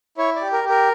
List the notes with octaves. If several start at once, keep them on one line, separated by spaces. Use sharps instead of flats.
E4 C#5
D5
G4
A#4
G4
A#4